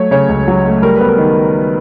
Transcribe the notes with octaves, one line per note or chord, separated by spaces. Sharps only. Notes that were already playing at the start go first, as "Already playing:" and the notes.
Already playing: F#3 A3 C#5
C#3 C#5
C#2
F#3
A3
G3 A#4
B3 B4
A#4
D#3